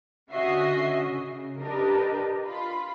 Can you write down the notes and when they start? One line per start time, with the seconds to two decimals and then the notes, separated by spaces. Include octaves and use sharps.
0.33 D3 C#4 F#4 D#5 E5 C7
1.06 C#3
1.61 D4 G4 A#4 B4 D#5
2.47 F4 B5